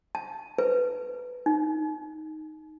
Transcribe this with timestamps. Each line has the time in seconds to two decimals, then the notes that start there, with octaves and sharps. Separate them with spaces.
0.15 A5
0.58 B4
1.46 D#4